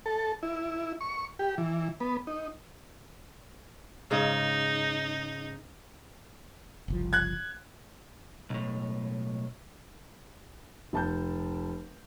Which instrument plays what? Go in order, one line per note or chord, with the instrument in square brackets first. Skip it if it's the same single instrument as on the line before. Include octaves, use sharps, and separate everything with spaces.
[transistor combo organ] A4
E4
C#6
G4
E3
B3
D#4
[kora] G#2 C#3 [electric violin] D#4
[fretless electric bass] F#1 C2 F3
[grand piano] F#6 G#6
[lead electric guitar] B1 A2
[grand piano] F1 A5 G6